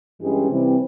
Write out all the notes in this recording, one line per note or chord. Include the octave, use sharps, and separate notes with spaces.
G2 E3 G#3 C#4 G4
C3 E3 G3 C4